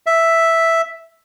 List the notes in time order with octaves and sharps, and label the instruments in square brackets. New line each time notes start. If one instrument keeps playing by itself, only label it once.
[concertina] E5